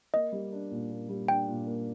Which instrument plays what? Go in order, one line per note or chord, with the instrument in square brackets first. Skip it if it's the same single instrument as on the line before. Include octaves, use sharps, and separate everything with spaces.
[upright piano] A#3 [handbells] D#5
[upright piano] G3
D4
A#2
A#3
G3
[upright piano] D4 [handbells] G5
[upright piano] A#2
A#3